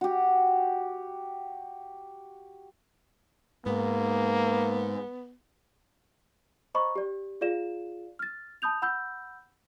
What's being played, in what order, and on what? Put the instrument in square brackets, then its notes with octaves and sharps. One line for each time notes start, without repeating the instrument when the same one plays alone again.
[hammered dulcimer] F#4 G4
[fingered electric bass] G#2 [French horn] A#3 [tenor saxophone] B3
[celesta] C5 D#5 A#5 B5 C#6 D6
G4 D5
F4 G#4 D5 F5 E7
F6 A6
A5 B5 D#6 G6 F7
F#5 B5 E6 G6